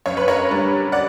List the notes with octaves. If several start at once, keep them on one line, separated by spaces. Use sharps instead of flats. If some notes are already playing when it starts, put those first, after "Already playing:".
F#2 C#5
B4
A#4 C#5
D3 G3
D5 F#5